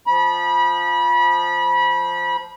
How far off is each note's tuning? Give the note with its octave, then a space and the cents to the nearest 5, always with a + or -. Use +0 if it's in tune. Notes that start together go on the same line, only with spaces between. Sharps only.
F3 +0 B5 -30